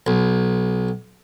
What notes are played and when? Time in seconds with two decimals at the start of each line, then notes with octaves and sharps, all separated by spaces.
0.07 B1